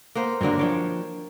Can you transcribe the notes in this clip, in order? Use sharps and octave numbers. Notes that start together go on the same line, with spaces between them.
A#3 B3 C5
G2 D3 F#3 A#3 D4
F3 D4 C#5 G5